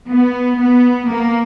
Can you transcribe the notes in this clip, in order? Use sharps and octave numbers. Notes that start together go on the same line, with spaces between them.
B3
B3
A#3